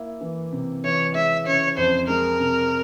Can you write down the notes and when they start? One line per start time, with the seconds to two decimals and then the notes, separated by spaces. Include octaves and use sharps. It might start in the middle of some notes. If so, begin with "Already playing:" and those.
Already playing: A#3 E4
0.21 E3
0.52 C3
0.84 E3 C#5
1.15 G#3 E5
1.46 C#3 C#5
1.77 F2 C5
2.08 G#3 A#4
2.40 C3